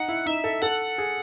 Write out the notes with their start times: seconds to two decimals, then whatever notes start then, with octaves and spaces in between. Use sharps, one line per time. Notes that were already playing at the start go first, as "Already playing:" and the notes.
Already playing: D#4 F#5
0.08 E4
0.26 D#4 E5
0.44 A4
0.62 A4 F#5
0.98 G#4